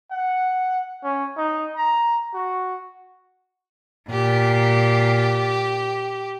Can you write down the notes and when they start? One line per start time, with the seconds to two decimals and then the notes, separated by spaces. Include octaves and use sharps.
0.11 F#5
1.03 C#4
1.37 D#4
1.76 A#5
2.34 F#4
4.10 A#2 G4